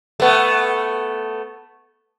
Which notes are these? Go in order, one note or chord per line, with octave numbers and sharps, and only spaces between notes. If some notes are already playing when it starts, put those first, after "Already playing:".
A3 B3